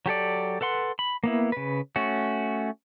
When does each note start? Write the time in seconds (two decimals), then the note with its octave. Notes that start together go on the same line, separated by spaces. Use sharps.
0.06 F#3 G4 A4 D5
0.61 A4 B4 F#5 C6
0.99 B5
1.24 A#3 B3 E4
1.52 C#3 B4
1.96 A3 C#4 F#4